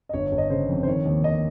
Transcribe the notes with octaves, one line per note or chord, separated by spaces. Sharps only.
D#5
G1 C#5
C#5
G1
D#5
C#3 C5
F2
C5
D#3 C#5
D#2
D#2 D#5